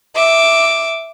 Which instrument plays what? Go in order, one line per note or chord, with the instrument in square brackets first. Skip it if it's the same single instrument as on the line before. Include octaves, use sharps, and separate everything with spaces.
[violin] E5 D6